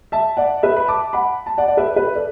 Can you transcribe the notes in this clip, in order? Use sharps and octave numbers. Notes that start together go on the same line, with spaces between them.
E5 A5
D5 F#5
B4 E5
B5
A5 D6
F#5 B5
A5
D5 F#5
D5
B4 E5
B4
A4 D5